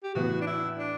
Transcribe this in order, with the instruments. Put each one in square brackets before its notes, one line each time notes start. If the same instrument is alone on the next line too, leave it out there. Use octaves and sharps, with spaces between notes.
[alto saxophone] G4
[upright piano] A2 E3 B3 [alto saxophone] F#4
[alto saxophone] D4
E4
D4